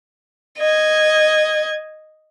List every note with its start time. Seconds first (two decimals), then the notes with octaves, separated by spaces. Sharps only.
0.58 D#5 G#6